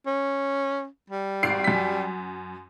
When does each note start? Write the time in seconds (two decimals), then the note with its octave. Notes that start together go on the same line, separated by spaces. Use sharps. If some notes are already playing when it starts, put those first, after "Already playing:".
0.06 C#4
1.10 G3
1.43 G#1 C7 D7
1.64 F#2 B6